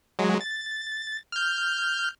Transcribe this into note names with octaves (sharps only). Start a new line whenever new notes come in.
F#3 G#3
A6
F6 G6